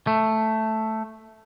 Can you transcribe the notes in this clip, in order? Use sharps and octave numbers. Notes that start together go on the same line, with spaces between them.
A3